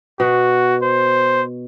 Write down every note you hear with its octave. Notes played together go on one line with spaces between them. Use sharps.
B2 F#4 F#5
C5